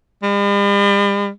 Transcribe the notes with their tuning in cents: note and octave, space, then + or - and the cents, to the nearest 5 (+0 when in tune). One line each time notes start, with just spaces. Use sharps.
G3 +45